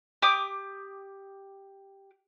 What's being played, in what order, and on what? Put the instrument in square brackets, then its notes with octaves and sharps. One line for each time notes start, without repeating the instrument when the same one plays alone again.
[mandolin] G4 D6 D#6